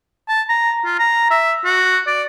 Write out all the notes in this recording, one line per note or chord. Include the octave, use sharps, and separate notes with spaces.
A5
A#5
F4
A#5
E5
F#4
D5